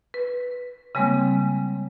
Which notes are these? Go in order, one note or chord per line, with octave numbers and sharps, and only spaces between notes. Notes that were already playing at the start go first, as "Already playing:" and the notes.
B4
C#3 G3 G#3 A#3 C4